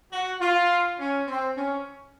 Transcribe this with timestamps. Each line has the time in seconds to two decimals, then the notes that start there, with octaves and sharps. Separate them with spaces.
0.11 F#4
0.40 F4
0.98 C#4
1.28 C4
1.56 C#4